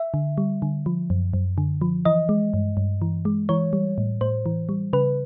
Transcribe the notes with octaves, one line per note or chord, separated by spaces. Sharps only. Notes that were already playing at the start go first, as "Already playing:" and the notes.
Already playing: E5
D3
G3
D3
F3
F#2
F#2
D3
F3
E3 D#5
G#3
G2
G2
E3
G#3
E3 C#5
G3
A2
A2 C5
E3
G3
C#3 B4